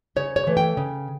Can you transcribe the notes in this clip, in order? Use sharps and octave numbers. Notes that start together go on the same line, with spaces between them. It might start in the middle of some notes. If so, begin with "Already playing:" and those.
C#3 C#5
C#5
E3 A3
G5
C#3